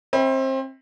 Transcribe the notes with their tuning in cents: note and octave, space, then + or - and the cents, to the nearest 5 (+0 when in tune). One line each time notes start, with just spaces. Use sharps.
C4 +25 E5 -45 B5 +0